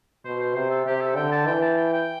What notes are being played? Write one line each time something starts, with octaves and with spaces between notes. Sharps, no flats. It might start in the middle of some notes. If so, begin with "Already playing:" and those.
B2 C5
C5
C3 C5
A4
C3 G4
A4
D3 G5
A5
E3 G5
A5
G5
G5